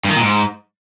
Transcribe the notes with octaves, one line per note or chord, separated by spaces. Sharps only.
G2
D#3
A#2
G#2